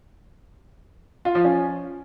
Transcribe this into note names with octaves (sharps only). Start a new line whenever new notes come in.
F4
F3
C#4